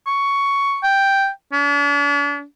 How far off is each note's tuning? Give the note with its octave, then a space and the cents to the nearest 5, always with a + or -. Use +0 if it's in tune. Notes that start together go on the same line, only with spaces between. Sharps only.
C#6 +10
G5 +0
D4 -45